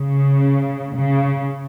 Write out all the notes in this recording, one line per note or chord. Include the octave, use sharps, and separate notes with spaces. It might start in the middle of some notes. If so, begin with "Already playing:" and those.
Already playing: C#3
C#3